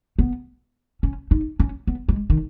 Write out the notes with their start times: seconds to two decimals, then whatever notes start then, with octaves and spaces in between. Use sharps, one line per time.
0.19 B3
1.03 C#4
1.31 D#4
1.60 C#4
1.87 B3
2.09 G#3
2.30 D#3